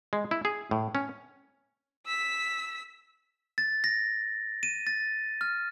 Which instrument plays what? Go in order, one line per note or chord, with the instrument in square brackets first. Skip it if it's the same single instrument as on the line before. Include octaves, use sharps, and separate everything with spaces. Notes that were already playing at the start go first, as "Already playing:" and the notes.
[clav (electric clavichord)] G#3
E4
G#4
A2
C#4
[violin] E6 B6
[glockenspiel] A6
A#6
D#7
A6
F6